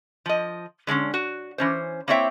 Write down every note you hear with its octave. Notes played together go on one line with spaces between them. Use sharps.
F3 D#5
D3 G#3 C4 C#4
F#4
E3 C#4 C5
A#3 C4 E4 C#5 E5 G5